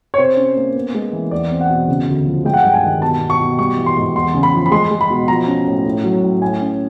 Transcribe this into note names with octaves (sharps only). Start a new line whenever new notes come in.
C#5
C3 C5
C#4
A#3
B3
G#3
E3
E2 D5
C4
F#5
B2
C#3
D2
F3
G#3 G5
F#5
G2 G5
G#5
D#3
B2 A5
B2
C#6
B2
G3 C#6
E3
C6
G#2
E2 C6
C#3
B5
F3
B5
G#3 C6
G#3
B5
B2
F3 A#5
C#4
A2
A2
F#3
A2
A2 G#5
C#4